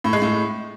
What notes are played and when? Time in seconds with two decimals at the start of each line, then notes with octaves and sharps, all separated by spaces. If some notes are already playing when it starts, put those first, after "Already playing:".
0.04 A2
0.13 G#3
0.22 A2